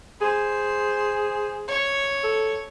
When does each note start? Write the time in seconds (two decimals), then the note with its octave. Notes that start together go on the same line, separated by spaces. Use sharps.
0.21 G#4 C5
1.68 C#5
2.24 A4